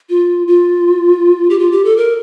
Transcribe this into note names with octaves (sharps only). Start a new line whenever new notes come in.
F4
F4
G4
F4
G4
A4
A#4